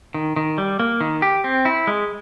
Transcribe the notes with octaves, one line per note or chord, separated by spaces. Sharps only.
D#3
D#3
G3
A#3
D#3
G4
C4
E4
G#3